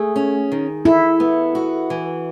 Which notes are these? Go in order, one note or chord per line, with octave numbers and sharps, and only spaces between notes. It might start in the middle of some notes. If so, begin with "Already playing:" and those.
Already playing: A3 G#4
C#4
D#3
E4 A4
B3
F#4
E3